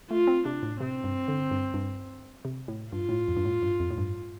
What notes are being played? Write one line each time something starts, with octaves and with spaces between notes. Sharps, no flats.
A3 F4
C4
C3 D4
A2
C3 C4
G2
D3
G2
G2
C3
A2
G2 F4
A2
F2
G2
A2
G2
F2
A2
G2